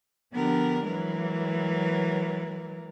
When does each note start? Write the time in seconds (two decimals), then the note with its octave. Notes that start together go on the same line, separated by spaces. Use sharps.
0.33 D3 F3 B3 D4 G4 A#4
0.86 E3 F#3 G#3 A#4 B4